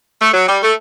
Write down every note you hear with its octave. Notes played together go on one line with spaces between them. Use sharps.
A3
F#3
G3
A3